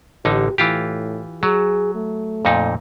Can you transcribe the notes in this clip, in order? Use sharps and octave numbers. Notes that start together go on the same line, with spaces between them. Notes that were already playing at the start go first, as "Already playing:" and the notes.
A1 D3 D#4 G4
A2 E3 F4 G4
F#3 G#4
A3
F2 A#2 D#4